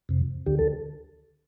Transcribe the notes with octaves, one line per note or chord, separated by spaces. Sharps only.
F2 C3
D2 D3 G4
A4